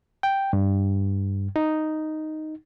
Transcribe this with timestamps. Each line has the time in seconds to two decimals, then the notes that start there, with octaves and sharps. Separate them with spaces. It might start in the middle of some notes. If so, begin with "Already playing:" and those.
0.23 G5
0.53 G2
1.56 D#4